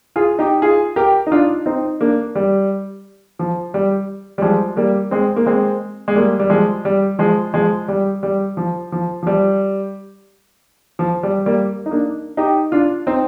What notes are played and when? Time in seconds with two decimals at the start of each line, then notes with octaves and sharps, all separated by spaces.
0.16 F4 G#4
0.39 D#4 G4
0.62 F4 G#4
0.96 G4 A#4
1.27 D#4
1.32 D4 F4
1.66 C4 D#4
2.01 A#3 D4
2.35 G3
3.39 F3
3.74 G3
4.38 G3
4.42 F3 G#3
4.77 G3 A#3
5.11 G#3 C4
5.36 A#3
5.46 G#3 C4
6.08 G#3
6.15 G3 A#3
6.39 G3
6.50 F3 G#3
6.85 G3
7.19 F3 G#3
7.54 F3 G#3
7.88 G3
8.23 G3
8.57 F3
8.92 F3
9.23 F3
9.27 G3
10.99 F3
11.23 G3
11.46 G3 A#3
11.86 D#4
11.91 A#3 D4
12.37 D#4 G4
12.72 D4 F4
13.07 C4 D#4